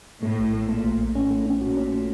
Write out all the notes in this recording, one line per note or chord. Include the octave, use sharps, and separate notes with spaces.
A2 A3
A#1
A3
A#2 A3
A#1
A#1
A2 C#4
A3
C#4
A#2 F#4
C#4
A3